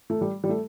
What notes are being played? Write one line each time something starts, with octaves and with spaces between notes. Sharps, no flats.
A3
G3
G3
A3